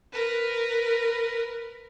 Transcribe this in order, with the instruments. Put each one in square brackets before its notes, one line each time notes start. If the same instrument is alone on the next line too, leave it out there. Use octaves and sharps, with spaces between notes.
[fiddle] A#4 B4